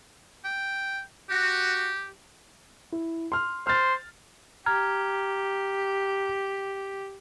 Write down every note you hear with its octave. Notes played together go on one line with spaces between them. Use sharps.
G5
F#4 G4
E4
C6 F6
C5 F6 A6
G4 A#5 F6 G#6